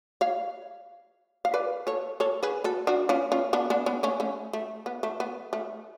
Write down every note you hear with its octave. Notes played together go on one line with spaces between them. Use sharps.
C#5 F5
F5
B4 D5
A4 C#5
A4 C#5
G#4 B4
F#4 A4
D4 F#4
C#4 F4
C#4 F4
B3 D4
B3 D4
B3 D4
A3 C#4
A3 C#4
A3
B3
A3
B3
A3